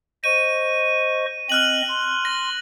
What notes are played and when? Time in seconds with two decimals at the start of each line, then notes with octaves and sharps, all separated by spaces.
0.24 C5 D#5 C#6 D#7
1.50 C4 D#5 F6 F#6 F#7
1.88 C6
2.25 A#6